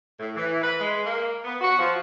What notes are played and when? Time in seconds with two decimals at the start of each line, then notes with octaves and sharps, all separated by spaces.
0.19 A2
0.36 E3
0.62 B4
0.80 G#3
1.04 A#3
1.44 B3
1.61 F#4
1.79 F3